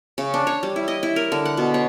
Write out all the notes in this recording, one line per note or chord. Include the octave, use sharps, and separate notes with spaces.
C#3
D4
C#5
G3
E4
D#5
E4
A#4
D3
F#5
B2
C#5